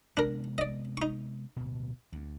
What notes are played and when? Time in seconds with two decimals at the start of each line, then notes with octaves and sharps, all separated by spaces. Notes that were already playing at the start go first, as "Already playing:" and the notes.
0.17 C3 G#3 B3 D4 A#4
0.58 D5 D#5
0.97 D#4 C#6
1.56 D1 B2
2.12 D2